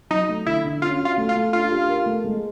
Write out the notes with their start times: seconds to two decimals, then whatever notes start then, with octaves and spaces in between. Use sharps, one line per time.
0.10 F#3 D#4
0.29 A3
0.46 D3 E4
0.65 D3
0.82 C#4 F4
1.00 F#4
1.05 F4
1.18 A3
1.29 F4
1.36 A3
1.53 D4 F4
1.71 G4
1.89 A#4
2.06 A3
2.24 G#3